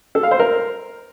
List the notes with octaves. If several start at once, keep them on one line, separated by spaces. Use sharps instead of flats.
A4
F5
C5
A#4